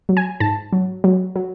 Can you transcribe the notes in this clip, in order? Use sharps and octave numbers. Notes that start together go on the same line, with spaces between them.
F#3
G#5
G#2 A5
F#3
F#3
F#3